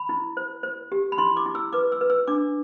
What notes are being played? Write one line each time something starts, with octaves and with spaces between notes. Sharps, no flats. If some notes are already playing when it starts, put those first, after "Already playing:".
Already playing: B5
E4
C5
C5
G4
B5
E4 C6
D6
E4
E6
B4 D6
E6
B4
E6
D4 D6